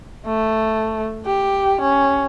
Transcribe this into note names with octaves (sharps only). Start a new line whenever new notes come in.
A3
G4
C#4